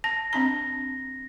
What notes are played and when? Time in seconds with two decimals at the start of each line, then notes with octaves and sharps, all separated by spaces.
0.04 A5 A#6
0.33 C4 D4 A#5